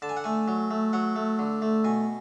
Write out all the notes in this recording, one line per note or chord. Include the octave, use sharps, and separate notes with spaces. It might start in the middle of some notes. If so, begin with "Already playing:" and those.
D3 A5
G#5
F#5
A3 G#5
F#3
A3
F#3 F#5
A3
D3
A3
B2 G#5